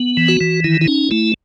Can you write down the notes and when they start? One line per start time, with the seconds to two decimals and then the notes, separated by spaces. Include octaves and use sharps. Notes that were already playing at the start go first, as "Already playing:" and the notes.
Already playing: B3
0.17 E3
0.28 F#4
0.41 E3
0.64 D#3 E4
0.81 E4
0.87 C#4 D#4
1.11 A3 E4